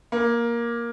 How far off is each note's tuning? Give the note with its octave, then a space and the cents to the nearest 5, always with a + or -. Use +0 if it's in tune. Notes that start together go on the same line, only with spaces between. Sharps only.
A#3 +10